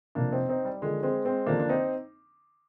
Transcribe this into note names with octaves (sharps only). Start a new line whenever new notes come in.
F2 C3 F3 A#3 D4
C4 D#4
C4 D#4
G3
D#2 D3 F3 G#3
G#3 C4
G#3 C4
F2 D3 F3 A#3 D4
D4
C4 D#4